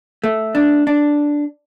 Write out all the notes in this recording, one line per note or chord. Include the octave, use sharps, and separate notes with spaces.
A3
D4
D4